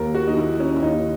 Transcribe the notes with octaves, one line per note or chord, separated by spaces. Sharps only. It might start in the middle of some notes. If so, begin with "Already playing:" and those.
Already playing: D#2 A#4
F#4
D#4
D#3 E4
C#4
E4
D#2 D#4